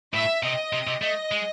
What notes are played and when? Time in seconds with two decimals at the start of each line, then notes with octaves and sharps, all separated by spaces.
0.14 A2 E5
0.43 C3 D#5
0.73 C3
0.87 C3
1.02 A3 D#5
1.32 G#3